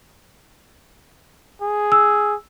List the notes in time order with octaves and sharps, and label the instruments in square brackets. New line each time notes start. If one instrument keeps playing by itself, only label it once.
[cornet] G#4
[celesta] E6